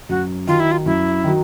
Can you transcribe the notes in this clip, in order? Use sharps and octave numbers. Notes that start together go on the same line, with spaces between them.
F#2 F#4
D#3 F#3 F4
E4
F4
F#2 E4
D#3 F#3